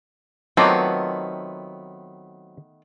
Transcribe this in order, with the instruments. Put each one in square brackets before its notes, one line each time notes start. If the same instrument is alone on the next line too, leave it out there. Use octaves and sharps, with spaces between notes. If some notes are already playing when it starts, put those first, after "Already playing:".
[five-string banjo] D#3 A3 B3 [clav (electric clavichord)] F#3 C4 F4 [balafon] D#5 D6